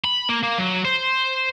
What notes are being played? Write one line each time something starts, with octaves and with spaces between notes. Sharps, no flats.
B5
A#3
A#3
F#3
C5